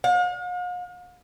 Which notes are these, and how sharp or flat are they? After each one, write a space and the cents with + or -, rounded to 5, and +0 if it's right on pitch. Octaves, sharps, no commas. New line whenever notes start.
F5 +45